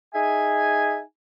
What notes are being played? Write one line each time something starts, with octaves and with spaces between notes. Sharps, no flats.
D#4 G#4 E5 G#5